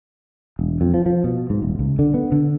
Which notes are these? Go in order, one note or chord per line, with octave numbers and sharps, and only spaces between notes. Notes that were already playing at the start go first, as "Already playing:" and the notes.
E1
F2
F3
F3
B2
G#2
D#1
C#2
D3
B3
D3